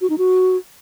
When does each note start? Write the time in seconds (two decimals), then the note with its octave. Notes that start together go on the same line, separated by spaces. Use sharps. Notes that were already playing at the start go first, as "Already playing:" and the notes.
0.01 F#4
0.10 D#4
0.18 F#4